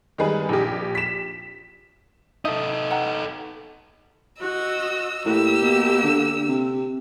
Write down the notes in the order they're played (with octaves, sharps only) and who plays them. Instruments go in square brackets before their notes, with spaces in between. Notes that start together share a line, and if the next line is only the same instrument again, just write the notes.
[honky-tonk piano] D#3 G3 G#3 G#4 B4
A#1 G4
B6 E7
[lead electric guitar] D#4 A4 [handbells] E5 D#6
[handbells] F#5 G5 A#5
[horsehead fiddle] F#4 [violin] D#5 E6
[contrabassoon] A2 [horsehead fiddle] A#3 G4 [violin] E6
[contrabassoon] B2
D3
C3